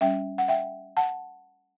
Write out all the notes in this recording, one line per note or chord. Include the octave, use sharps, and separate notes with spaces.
G3 C#4 E5 G5
F#5
E5 G5
F#5 A5